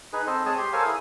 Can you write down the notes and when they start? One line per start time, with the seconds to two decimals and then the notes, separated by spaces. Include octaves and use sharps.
0.13 D#4 G#4 B4
0.27 C4 A4 C5 D#5
0.46 G#3 C4 G#4 C#5 A5 D#6
0.57 G4 C6
0.73 A4 A#4 C5 C#5 F5 G#5
0.85 E4 G#4 D#6